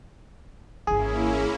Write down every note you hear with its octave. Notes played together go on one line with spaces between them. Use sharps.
G#1 E3 A#3 C#4 E4 G#4